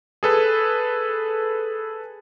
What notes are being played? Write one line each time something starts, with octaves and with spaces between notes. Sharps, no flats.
G#4 A4 B4